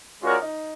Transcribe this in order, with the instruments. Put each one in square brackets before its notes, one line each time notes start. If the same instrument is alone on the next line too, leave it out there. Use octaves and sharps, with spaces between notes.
[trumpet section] G#3 C#4 F#4 A#4 D5 [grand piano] F4
[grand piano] D#4